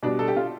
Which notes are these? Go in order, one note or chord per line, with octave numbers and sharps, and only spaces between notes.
B2 G3 D4
A4
G4
F4